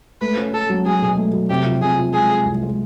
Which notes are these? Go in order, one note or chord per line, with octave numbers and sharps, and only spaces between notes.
A3 B4
C#4
C#4 A4
F#3
F#3 G#4
B2
A3
F#3
C3 G4
F3
C3 G#4
F3
G#3 G#4
G#3
C2
G#3